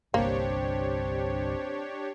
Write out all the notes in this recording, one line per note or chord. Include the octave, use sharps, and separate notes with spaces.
G1 C2 A#3 C4 D4 G4 C#5